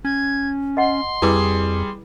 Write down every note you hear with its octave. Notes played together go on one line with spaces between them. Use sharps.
C#4 G#6
D#5 F#5 C6
F2 G3 E4 G#4 B4 D6